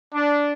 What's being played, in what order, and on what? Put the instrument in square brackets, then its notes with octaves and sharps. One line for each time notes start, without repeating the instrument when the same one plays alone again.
[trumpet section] D4